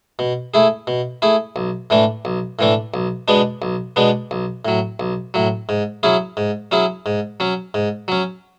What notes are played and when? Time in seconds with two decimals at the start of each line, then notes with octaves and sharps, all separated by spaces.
0.19 B2
0.54 A3 E4 G#4
0.87 B2
1.22 A3 E4 G#4
1.56 B1
1.90 A2 E3 A3 D4
2.25 B1
2.59 A2 E3 A3 D4
2.94 B1
3.28 B2 G#3 B3 D4
3.62 B1
3.96 B2 G#3 B3 D4
4.31 B1
4.65 A2 F#3
5.00 B1
5.34 A2 F#3
5.69 G#2
6.03 F#3 C#4 E4 G#4
6.37 G#2
6.71 F#3 C#4 E4 G#4
7.06 G#2
7.40 F#3 C#4
7.74 G#2
8.08 F#3 C#4